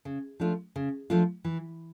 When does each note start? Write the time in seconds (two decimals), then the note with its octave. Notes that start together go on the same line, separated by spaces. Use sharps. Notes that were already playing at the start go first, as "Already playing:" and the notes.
0.05 C#3
0.40 F3 A3 D4 F4
0.76 C#3
1.10 F3 A3 D4 F4
1.44 E3